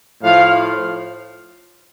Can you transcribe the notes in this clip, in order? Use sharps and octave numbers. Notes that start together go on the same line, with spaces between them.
A2 F3 F5